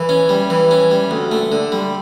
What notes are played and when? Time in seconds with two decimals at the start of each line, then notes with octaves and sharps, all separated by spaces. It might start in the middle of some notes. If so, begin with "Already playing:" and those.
Already playing: E3
0.09 C#4
0.29 G3
0.50 E3
0.71 C#4
0.91 G3
1.11 D2
1.32 A3
1.52 D3
1.72 G3